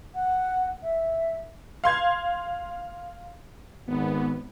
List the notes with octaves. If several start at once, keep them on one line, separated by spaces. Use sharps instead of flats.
F#5
E5
F5 C6 G#6
G#1 B3